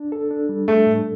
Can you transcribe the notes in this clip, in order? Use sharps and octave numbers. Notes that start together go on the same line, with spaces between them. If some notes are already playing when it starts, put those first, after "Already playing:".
Already playing: D4
A4
D4
G3
A3 A4
A2